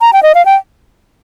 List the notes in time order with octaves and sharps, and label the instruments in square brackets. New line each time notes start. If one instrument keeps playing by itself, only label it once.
[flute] A#5
G5
D#5
F5
G5